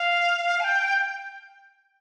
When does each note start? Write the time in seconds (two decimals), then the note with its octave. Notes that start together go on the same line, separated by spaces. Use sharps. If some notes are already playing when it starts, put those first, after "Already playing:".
Already playing: F5
0.60 A5
0.64 G5